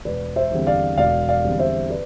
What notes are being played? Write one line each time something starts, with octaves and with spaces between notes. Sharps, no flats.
E1 B4 D5
C5 E5
E2 D3 G3 C4
D5 F5
E1 D5 F5
D5 F5
E2 D3 G3 C4
C5 E5
B4 D5